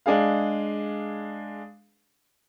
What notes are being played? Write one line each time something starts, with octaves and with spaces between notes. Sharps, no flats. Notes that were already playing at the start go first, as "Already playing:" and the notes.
G#3 D4 G#4 F5